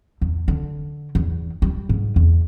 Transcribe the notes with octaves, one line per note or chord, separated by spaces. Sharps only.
E2
D3
E2
G3
G#2
E2